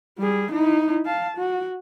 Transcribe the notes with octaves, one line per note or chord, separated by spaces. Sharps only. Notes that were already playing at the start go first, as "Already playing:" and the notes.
G3 G#4
D#4 E4
F5 A5
F#4